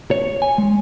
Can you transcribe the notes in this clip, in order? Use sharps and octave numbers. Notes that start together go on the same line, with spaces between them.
C#5
G#5
G#3